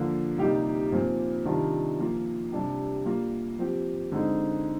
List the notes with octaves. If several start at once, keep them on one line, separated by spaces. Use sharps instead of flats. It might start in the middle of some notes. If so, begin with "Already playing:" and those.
Already playing: D3 F3 A#3 F4
C3 G3 A#3 D#4 G4
A#2 F3 C4
C3 D#3 G3 D4 F4
F3 A#3 F4
C3 G3 D4 G4
G3 A#3 F4
F3 C4 G4
D3 G#3 C4 D#4